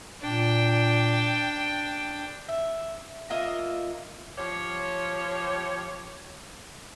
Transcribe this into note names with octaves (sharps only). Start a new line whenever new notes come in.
A#2 D4 G5
E5
A#3 F4 D#5 E5
F3 G4 C#5